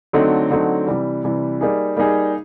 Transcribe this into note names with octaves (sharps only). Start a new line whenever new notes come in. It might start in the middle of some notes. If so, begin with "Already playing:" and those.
D3 F#3 A3 C4 D#4
D3 F#3 A3 C4 D#4
C3 E3 G3
C3 E3 G3
G3 A#3 D#4 G#4
G3 A#3 D#4 G#4